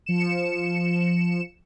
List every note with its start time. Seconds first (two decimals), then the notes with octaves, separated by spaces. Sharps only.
0.06 F3 C#7 E7